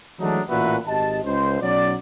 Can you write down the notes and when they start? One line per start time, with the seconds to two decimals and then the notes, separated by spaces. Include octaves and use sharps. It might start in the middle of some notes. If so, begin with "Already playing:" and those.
0.19 E3 F#3 G#3 A3 D4 D#4
0.48 A1 A#2 E3 F#4 B4 E5
0.86 G#1 G4 D#5 A5
1.24 C#2 C5
1.61 B1 F#3 C#4 D5